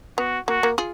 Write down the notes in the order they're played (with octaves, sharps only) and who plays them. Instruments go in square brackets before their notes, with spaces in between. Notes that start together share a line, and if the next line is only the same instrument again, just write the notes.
[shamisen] B3 [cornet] F#4
[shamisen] A#3 [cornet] F#4
[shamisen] A#3
F4 G#4